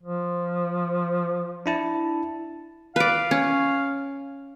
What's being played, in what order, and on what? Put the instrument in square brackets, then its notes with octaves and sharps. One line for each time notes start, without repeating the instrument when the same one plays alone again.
[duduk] F3
[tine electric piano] D4 E4 A5
[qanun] B4 D5 [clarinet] F5
[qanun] C#4